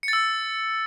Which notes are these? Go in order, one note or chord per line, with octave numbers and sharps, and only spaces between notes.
C#7
A6
E6